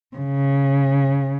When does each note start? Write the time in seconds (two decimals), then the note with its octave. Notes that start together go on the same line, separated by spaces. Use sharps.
0.17 C#3